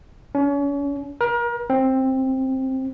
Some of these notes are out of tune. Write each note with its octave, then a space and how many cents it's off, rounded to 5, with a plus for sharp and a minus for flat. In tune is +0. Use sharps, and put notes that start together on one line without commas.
C#4 +35
A#4 +35
C4 +10